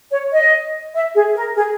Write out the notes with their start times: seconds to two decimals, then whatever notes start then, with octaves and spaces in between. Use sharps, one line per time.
0.10 C#5
0.31 D#5
0.94 E5
1.15 G#4
1.35 A#4
1.56 G#4